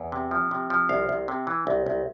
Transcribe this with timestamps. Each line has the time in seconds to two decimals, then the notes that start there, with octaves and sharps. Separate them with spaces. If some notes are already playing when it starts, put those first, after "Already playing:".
Already playing: E2
0.12 C3
0.31 F3
0.51 C3
0.70 F3
0.89 C2 F5
1.09 C2
1.28 C3
1.47 E3
1.67 C2
1.86 C2